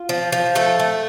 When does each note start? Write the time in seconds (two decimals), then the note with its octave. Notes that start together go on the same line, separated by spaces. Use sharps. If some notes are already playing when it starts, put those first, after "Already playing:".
Already playing: F4
0.09 F3
0.32 F3
0.55 A3 A4
0.79 A3